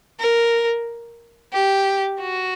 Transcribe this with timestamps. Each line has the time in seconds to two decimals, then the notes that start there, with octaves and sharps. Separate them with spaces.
0.20 A#4
1.53 G4
2.20 F#4